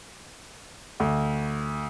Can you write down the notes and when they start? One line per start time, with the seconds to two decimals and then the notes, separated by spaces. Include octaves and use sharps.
1.00 D2